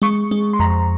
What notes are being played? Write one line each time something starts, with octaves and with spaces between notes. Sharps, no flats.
G#3 C#6
G#3
C6
F2 A#5